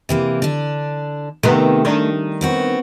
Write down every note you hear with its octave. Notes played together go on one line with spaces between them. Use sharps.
C3 E3 A#3
D3 D4
C3 D#3 A3 B3
D#3 G3 D4
B3 C4 F#4